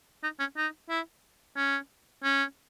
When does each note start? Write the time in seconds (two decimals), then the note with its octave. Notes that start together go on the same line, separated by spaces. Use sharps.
0.23 D#4
0.40 C#4
0.57 D#4
0.89 E4
1.56 C#4
2.23 C#4